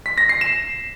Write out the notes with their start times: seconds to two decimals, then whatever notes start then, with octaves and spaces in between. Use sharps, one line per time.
0.06 B6
0.18 A#6
0.29 C7
0.41 E7